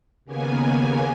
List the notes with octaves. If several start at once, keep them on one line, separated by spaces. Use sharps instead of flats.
D#2 C#3 A#3 B3 G#5